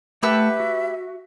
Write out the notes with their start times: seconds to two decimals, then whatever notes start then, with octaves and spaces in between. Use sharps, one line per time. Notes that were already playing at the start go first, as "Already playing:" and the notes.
0.23 A3 G4 B4 E5 F#5 A5 E6
0.60 F#4